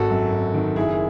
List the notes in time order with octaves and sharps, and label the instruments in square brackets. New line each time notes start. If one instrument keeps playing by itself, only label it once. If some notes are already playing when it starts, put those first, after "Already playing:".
Already playing: [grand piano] G#1 F#4 A4
F#2
G#1
D#3
F#1 E4 G#4